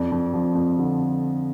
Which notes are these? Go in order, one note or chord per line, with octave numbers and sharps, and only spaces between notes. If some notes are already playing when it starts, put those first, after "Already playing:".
Already playing: F2 D5
F2
F3
F2
D3